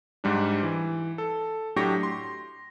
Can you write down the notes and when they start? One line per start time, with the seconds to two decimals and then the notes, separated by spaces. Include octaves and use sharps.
0.24 G#2 G3 D4
0.63 E3
1.18 A4
1.76 A2 F#3 D4 G4 C#6 A#6
2.03 C6